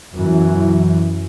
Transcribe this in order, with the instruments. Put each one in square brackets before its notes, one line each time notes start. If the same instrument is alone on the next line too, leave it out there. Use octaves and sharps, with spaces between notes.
[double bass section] F#2 B2 E3